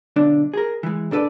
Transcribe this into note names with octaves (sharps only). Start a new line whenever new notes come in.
B1 D3 D4
G#4 A#4
E3 G#3
A#2 D4 A4 B4 D5